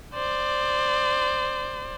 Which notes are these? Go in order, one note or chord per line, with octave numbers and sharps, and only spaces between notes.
C5 D5